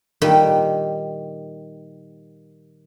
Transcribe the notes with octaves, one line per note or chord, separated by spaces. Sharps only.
A#2 D#3 G3 G4